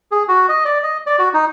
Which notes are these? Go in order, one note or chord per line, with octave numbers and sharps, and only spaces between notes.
G#4
F#4
D#5
D5
D#5
D5
F#4
D#4